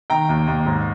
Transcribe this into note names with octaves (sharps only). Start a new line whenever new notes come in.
D#3 G5 A#5
D#2
D#2
G#2